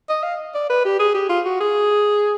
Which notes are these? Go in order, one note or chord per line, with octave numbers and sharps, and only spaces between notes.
D#5
F5
D5
B4
G4
G#4
G4
F4
F#4
G#4